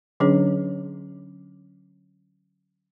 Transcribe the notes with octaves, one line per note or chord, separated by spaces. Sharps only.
D3 F#3 C#4 D4 G#4 C#5